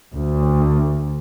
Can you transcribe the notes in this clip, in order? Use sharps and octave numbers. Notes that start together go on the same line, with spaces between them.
D2